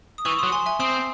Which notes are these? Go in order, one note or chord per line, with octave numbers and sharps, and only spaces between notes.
D#6
E3 C#6 E6
C6 D#6
F#3
G#5 C6
E5 G#5
C4 C6 D#6